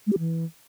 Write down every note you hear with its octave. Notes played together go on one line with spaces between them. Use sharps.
G#3
G4
E3